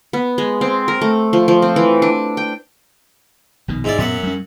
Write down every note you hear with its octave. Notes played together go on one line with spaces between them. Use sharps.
B3
G#3
C4
A#4
A3
F3
F3
C4
E3
D4
G5
A#1 B2 D#3
G#2 E4 D5
F#2 A#2 B3 E5 F#5
G3 C#4